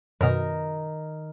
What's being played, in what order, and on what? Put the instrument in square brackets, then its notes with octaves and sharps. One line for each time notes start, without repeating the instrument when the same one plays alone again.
[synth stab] F#2 B2 [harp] D#3 A#4